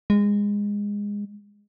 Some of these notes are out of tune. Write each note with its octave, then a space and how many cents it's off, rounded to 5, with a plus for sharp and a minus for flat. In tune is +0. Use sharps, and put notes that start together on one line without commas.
G#3 -20